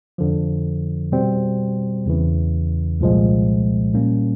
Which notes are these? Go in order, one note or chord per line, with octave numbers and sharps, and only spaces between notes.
F2 D3 F3
B2 G3 C4
E2 C#3 E3
C2 A#2 F3 G#3
A#2 G3 A#3 C#4